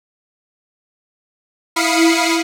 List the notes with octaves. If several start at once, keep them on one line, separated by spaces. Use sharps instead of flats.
E4 F5 B5 D#6 C7 C#7